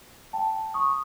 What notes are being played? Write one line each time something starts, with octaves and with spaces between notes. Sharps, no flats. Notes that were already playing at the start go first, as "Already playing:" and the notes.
G5 A5
C#6 D#6